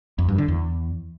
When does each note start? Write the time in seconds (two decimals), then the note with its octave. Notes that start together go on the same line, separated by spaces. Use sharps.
0.19 F2
0.28 G2
0.38 D3
0.48 E2